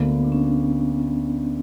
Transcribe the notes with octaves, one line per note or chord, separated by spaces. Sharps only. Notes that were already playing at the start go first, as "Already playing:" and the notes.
Already playing: D2 D3 A#3 B3
B3
D4
C#4
B3